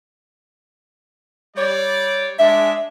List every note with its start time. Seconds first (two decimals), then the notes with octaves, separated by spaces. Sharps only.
1.57 G3 C#5 D5
2.39 G#3 D4 E5